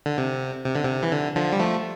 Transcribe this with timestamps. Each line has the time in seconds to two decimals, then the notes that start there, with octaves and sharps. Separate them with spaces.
0.06 D3
0.18 C3
0.65 C3
0.75 D3
0.84 C3
1.03 E3
1.12 D3
1.36 D3 F3
1.53 G3
1.59 F3 A3